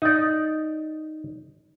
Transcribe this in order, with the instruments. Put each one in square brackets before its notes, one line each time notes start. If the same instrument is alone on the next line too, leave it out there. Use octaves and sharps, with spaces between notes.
[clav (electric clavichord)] D#4 D5